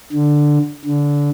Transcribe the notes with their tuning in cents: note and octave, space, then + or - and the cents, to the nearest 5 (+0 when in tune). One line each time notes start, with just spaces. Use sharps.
D3 +5
D3 -20